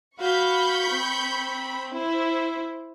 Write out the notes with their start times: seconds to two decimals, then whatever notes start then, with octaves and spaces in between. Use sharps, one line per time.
0.19 F#4 F5 B5 C#6 G6
0.90 C4
1.94 E4 C5